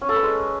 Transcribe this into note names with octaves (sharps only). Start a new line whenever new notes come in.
C#4
A4
B4
G#3